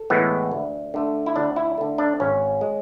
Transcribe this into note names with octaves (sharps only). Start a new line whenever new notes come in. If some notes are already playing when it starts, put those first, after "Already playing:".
Already playing: A4
A2 E3 G#3 B3
D2
D3 A3
E4
D2 D4
E4
D3 A3
D4
G#1 C#4
G#3